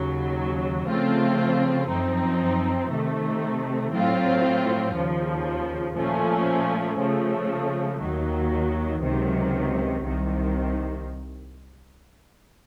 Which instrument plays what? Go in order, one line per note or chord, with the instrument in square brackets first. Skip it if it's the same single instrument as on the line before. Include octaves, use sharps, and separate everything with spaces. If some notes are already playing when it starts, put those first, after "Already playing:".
Already playing: [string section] D#2 C#3 F#3
C#3 F3 A3 C4 F4
F#2 F3 C4 D#4
C3 D#3 A3
A2 F#3 C4 F4
D#2 C#3 F3
A#2 F3 A3 C#4
C#3 F3 A3
D#2 D#3 F#3
C#2 C3 D#3 F#3
C2 C3 D#3